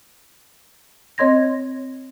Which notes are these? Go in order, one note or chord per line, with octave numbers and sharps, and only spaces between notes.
C4 C#5 D#5 C6 G#6 A#6